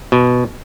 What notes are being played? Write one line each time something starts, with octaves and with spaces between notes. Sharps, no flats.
B2